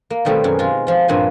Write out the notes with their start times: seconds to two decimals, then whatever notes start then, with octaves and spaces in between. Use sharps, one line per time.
0.10 A#3
0.25 B2 D#3 G3 A3 C4
0.44 F#2 G#4
0.59 G#3 F4
0.87 F3 F4
1.08 G2 A#2 F3 C4 G#5